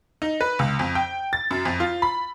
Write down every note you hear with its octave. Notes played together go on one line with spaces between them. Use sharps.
D#4
B4
C#2
F2
G5
A6
F#2
F2
F4
B5